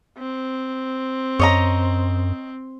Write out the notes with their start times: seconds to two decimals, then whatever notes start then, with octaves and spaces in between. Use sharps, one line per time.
0.18 C4
1.39 F#2 C#5 D#5 A#5